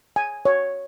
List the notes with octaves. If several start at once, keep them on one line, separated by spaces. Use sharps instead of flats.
G#5
C#5